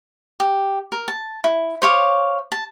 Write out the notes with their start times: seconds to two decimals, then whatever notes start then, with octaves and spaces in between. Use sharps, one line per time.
0.40 G4
0.92 A#4
1.08 A5
1.44 E4
1.82 C5 C#5 F5 D6
2.52 A5